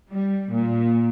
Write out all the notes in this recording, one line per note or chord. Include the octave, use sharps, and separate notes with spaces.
G3
A#2